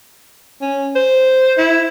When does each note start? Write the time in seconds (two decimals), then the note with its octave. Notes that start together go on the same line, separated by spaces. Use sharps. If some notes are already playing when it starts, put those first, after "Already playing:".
0.61 C#4
0.95 C5
1.58 E4